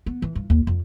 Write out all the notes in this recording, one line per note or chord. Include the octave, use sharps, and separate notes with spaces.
B3
E3
G2
D#2
F2